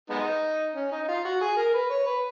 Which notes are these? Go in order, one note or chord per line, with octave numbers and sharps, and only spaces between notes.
G#3 B3 D#4
C#4
D#4
F4
F#4
G#4
A#4
B4
C#5
B4